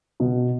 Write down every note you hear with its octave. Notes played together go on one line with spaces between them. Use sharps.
B2